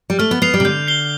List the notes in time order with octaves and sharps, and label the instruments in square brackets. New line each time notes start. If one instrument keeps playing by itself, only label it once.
[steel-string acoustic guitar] G3
[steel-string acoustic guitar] A3 [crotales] F6
[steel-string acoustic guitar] B3
[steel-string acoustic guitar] B3 [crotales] C7 F7
[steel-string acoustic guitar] G3
C3
[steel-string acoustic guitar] D3 [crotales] G6
[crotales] C7 G7